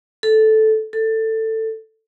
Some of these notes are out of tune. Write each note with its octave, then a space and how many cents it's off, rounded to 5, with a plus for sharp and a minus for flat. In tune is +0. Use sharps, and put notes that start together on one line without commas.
A4 -10
A4 +15